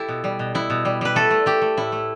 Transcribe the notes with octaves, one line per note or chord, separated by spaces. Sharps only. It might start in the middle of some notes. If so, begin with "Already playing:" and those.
Already playing: E4 G4 A4 D5
B2
G3
B2
B2 E4
B2
G3
G3 B4
A3 A4
A3
A3 G4
A3
A2 E4
A3